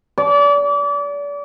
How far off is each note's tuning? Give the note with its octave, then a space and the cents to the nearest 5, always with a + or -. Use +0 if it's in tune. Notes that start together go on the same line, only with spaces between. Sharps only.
D5 -35